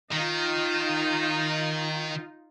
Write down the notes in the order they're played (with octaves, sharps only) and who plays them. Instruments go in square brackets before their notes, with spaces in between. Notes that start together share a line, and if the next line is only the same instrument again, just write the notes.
[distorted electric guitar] D#3 [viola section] D#4 F4